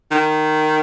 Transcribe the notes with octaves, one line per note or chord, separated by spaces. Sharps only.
D#3